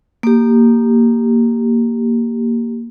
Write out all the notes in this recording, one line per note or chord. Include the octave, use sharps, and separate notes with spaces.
A#3 G4